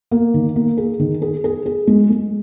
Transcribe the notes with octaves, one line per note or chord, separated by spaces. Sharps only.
A#3
D#3
A#3
G#4
D#3
G#4
G#4
G#4
G#3
G#3